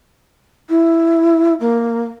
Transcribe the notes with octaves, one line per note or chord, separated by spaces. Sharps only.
E4
A#3